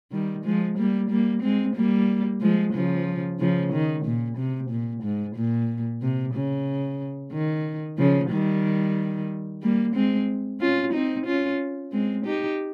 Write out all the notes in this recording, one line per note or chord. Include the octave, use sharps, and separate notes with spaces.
D#3 G3
F3 G#3
G3 A#3
G3 A#3
G#3 C4
G3 A#3
F3 G#3
C#3 F3
C#3 F3
D#3
A#2
C3
A#2
G#2
A#2
C3
C#3
D#3
C#3 F3
D#3 G3
G3 A#3
G#3 C4
C#4 F4
C4 D#4
C#4 F4
G#3 C4
D#4 G4